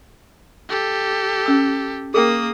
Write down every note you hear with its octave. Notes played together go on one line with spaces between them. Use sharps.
G4 A4
C#4 E6
A#3 G#4 A#4 G5 D#6